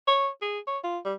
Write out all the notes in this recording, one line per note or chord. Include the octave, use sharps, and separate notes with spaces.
C#5
G#4
C#5
F4
G3